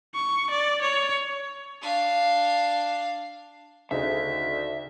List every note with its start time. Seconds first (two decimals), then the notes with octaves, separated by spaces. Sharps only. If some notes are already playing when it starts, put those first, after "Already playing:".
0.15 C#6
0.51 D5
0.81 C#5
1.81 D4 F5
3.91 D2 C#3 D#4 D#5 E5